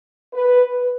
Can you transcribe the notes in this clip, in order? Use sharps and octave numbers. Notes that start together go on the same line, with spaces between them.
B4